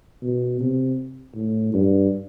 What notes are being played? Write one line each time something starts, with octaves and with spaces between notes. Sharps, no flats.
B2
C3
A2
G2